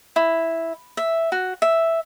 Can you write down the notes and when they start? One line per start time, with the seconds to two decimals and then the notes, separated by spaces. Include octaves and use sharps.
0.16 E4
0.97 E5
1.32 F#4
1.62 E5